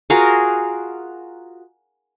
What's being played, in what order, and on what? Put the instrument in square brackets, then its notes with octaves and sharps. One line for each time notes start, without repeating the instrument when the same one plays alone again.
[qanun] F4 F#4 G#4 A#4